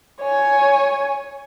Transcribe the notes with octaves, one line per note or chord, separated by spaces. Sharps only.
C#5 G#5